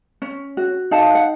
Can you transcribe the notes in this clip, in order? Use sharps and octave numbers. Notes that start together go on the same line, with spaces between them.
C#4
F#4
D#4 F5 A5
F#5